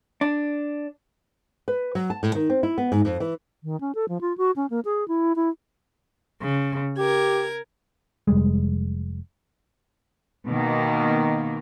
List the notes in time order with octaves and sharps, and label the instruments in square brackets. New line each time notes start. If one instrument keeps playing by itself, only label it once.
[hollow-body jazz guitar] D4
[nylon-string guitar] B4
F#3
A5
A2
D#3
C4
E4
B3
G#2
F2
E3
[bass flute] D#3
C#4
A4
F3
F4
F#4
C#4
A#3
G#4
E4
E4
[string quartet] C#3
[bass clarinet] G4 [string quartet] A#4 G#6
[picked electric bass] F1 G3 G#3
[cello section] B2 D#3 A#3